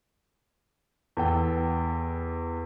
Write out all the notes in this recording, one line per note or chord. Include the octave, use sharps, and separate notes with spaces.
E2 A4 G5